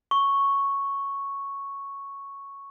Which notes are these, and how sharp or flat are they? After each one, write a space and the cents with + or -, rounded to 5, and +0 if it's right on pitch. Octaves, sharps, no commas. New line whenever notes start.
C#6 +0